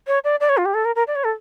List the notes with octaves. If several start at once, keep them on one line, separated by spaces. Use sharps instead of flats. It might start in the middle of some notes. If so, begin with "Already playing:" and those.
C#5
D5
D5
C#5
F4
G4
A4
A#4
A#4
D5
C#5
A4